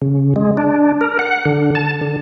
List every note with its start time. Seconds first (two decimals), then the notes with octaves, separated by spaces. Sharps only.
0.02 C#3
0.36 G#3
0.57 D4
1.01 A#4
1.19 F#5
1.45 D3
1.75 A5
2.01 D3